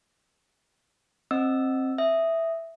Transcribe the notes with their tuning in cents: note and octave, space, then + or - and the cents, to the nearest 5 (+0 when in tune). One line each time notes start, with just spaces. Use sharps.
C4 +20 D#5 +0 E6 +0
E5 +0 D#6 +0